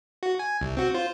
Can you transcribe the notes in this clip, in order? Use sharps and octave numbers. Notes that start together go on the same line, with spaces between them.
F#4
G#5
C2
C4 F#4
F4 C5